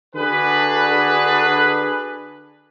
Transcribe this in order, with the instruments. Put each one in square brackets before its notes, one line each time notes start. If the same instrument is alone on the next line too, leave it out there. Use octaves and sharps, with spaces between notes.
[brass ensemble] D3 D4 F#4 G#4 B4